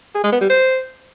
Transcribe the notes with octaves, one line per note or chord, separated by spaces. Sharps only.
G#4
G#3
B3
G3
C5